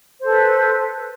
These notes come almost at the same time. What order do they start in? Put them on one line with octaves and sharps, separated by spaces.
C5 A4 B4